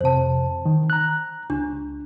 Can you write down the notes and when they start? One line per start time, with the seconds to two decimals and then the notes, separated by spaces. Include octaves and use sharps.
0.01 F2 C3 C5 A5
0.65 D#3
0.90 A#5 F#6
1.50 C#2 D4